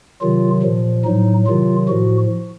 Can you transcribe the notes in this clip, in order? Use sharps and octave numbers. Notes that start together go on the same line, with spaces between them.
C3 D#3 F#3 F4
A#2 F3
A2 F#3 D#4
C3 D#3 F#3 F4
A2 F3 F#4